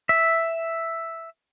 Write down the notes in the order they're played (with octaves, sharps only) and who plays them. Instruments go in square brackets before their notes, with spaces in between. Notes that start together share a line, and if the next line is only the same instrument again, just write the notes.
[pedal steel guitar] E5